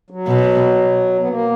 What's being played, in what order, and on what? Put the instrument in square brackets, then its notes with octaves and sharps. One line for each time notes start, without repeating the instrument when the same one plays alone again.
[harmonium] F#3
[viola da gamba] B2
[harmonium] B3
A#3